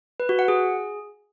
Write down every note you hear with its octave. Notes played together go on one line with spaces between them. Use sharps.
B4
F#4
F#5
G#4